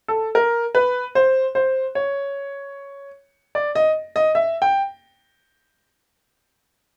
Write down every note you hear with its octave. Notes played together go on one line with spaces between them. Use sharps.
A4
A#4
B4
C5
C5
C#5
D5
D#5
D#5
E5
G5